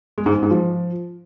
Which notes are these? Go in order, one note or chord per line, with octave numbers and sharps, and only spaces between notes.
G#3
G#2
G#3
G#2
F3